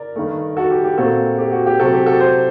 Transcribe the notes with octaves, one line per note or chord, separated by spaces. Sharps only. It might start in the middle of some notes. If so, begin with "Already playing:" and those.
Already playing: A#4 D5
G2 D#3 A3
F#4 A4
G4
G4
A#2 A3 C4 F#4 A4
G4
F#4
G4
C3 F#3 A3 C4 F#4 A4
G4
F#4 A4
A4 C5